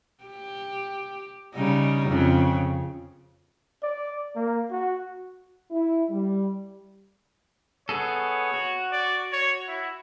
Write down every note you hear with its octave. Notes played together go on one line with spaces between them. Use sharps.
G4
C#3 G3 D#4
F2 C#3
D5
A#3
F#4
E4
G3
B3 G#4 A4 C#5
F#4
D5
C#5
E4